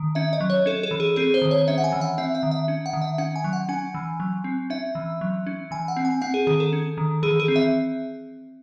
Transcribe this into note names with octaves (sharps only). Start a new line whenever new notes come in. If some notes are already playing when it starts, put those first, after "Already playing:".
Already playing: D#3
C#4 E5
D#5
F#3
C#5
C#4 A4
A4
E3
G#4
C4 G#4
C5
D#3
C#5
C#4 E5
F#5
G#5
E3
F#5
C4 E5
E5
D#3
E5
C#4
F#5
D#3
E5
C#4 F#5
G#5
F#3
F#5
C#4 G#5
E3
F#3
C4
C#4 E5
E3
F#3
C#4
E3 G#5
F#5
C4
G#5
C4 F#5
G#4
D#3 G#4
A4
C#4
D#3
E3 G#4
G#4
C4
E5